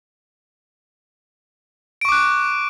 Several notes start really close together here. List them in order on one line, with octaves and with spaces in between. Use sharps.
D7 C#6 D6 F#6